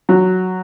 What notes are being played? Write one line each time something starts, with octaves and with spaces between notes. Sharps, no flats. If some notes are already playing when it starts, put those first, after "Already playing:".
F#3